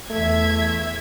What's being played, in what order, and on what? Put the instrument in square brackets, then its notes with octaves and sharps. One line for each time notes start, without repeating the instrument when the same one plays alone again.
[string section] E2 E5 G#6 [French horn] A3